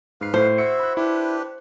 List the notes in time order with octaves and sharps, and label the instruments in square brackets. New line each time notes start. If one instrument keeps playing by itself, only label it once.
[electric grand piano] G#2 C7 [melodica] B4 F5
[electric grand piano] A2 [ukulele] C5
[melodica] E4 F#4 E5 [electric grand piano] C#7
[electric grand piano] B5 F#6
[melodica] D4 G4 B4 [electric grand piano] E4